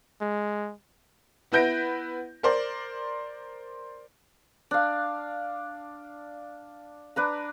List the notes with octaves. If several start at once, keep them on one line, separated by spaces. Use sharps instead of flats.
G#3
B3 E4 B4 G6 A#6 D7
A#4 C5 D5
D4 F5
D4 B4 A#5